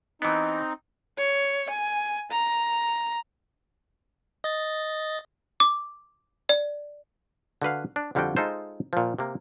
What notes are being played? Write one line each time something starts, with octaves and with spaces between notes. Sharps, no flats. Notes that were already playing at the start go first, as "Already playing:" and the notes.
E3 B3 C4 D#4
C#5
G#5
A#5
D#5 A6
D6
D5
D3 F#4 B4 F5
D4
F2 D3 G3 F4 F#4 G5
G#3 D#4 F4 A4 C5
A#2 F3
C3 A#3